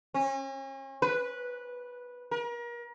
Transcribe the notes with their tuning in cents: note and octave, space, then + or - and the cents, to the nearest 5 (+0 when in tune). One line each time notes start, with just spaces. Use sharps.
C#4 -40
B4 -10
A#4 +35